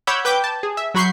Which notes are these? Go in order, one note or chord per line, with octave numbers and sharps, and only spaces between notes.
C#5 F#5 B5 D6 E6 G6
B4 G5 D6 G6
A5
G#4
E5
F#3 F#4 B5 C#6 G6 C7